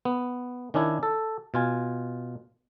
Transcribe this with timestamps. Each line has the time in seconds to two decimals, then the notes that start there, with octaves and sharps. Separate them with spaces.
0.05 B3
0.74 D#3 C#4 D4 E4 C#5
1.03 A4
1.54 B2 F4 G#5